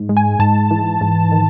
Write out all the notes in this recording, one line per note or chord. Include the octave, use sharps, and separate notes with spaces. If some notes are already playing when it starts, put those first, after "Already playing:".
Already playing: G#2
G#3
G#5
G#2 A5
E3
G#2
D#3